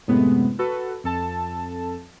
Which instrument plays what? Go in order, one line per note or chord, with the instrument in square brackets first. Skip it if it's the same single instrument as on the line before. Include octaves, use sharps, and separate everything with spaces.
[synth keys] F#2 A2 C3 G#3 B3
F#4 A4 B4
F2 A4 A5